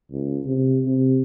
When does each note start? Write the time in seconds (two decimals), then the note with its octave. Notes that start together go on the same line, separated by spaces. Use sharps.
0.11 C#2
0.46 C3
0.86 C3